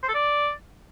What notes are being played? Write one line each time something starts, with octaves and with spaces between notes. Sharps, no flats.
C5
A4
D5